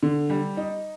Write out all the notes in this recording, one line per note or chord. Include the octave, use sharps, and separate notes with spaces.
D3
G3
D#4